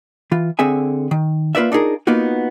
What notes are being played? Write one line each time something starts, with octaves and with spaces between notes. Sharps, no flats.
E3 F4
D3 C4 G#4 E5 G#5
D#3
A#3 F4 B4 D5 E5
D4 D#4 F4 G#4 A#4
A#3 B3 D#4 F4 F#4